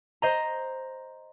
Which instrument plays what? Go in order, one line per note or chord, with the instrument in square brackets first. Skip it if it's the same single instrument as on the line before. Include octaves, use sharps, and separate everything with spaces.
[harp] C5 D#5 A#5